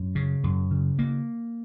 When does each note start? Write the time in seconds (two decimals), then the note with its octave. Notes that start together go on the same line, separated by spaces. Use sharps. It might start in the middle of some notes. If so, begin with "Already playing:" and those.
Already playing: F#2
0.15 C#3
0.44 F#2
0.71 C#3
0.99 A#3